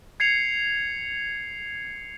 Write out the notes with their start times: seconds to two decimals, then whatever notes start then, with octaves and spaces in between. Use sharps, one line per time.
0.20 G#6 C7 C#7 F7